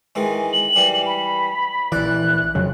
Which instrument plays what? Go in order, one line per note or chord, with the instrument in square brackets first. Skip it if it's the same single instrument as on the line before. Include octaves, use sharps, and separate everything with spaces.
[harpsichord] D#3 E3 G#3
[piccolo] F#7
[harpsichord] E3 G3
[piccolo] B5
[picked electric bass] A#1 E3 [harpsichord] D5 [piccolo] F#6
[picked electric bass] F2 C#3 F#3